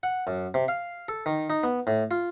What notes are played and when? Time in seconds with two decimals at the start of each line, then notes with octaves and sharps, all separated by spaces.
0.03 F#5
0.27 F#2
0.54 C3
0.68 F5
1.09 A4
1.26 D#3
1.50 D#4
1.63 B3
1.87 A2
2.11 F4